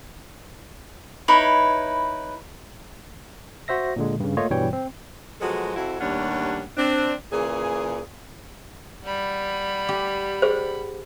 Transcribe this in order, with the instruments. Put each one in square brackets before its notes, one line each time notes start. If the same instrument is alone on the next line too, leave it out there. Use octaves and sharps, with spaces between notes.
[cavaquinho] D#4 E4 B4 C#5
[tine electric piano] F#4 C5 E5 A#6
A#2 D3 G#3
G2 C#3
A3 A#3 F4 C#5 D#5
G2 B2 E3 G3 C#5 G5
C4
[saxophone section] F3 F#3 G#3 B3 F#4 A4
F2 E4 F#4
D#2 G3 A3 C#4 D4 F#5
C4 D4
A#2 C#3 E3 G#4
[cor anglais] G3 [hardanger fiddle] F#5 B5
[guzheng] G4
[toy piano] G#4 C5